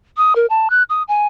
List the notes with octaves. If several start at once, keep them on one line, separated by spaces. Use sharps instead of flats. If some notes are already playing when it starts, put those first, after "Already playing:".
D#6
A#4
A5
F#6
D#6
G#5